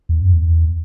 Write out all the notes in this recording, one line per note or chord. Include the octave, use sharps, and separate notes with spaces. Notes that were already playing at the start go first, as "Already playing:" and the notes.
E2
F#2
E2